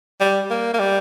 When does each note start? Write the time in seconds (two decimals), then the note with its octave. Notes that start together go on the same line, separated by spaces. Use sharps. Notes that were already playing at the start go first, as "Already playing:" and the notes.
0.20 G3
0.50 A#3
0.74 A#3
0.80 G3